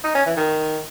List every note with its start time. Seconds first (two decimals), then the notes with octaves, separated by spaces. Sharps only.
0.04 D#4
0.15 C#4
0.26 E3
0.37 D#3